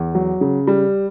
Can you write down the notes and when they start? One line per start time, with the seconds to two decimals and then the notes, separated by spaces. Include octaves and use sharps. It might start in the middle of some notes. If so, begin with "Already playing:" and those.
Already playing: E2
0.15 F#3
0.41 C#3
0.67 G3